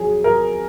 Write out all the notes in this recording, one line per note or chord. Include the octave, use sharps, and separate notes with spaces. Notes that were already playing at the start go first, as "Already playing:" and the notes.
Already playing: F2 F#3 G#4
A#4